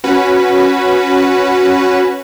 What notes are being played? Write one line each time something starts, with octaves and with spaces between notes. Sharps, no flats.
C#4 F#4 B4